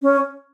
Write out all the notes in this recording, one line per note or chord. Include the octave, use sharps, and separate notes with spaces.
C#4